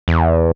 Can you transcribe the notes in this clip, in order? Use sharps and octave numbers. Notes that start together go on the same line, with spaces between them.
E2